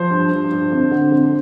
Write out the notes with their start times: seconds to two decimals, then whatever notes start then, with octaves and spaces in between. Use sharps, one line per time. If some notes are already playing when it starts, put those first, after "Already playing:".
Already playing: F3 C5
0.11 G2
0.31 G2
0.52 G2
0.72 F2
0.91 D3
1.12 F2